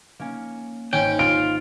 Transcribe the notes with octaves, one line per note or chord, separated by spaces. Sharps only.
A#3 C#4
G#1 C#4 G5
F4 D7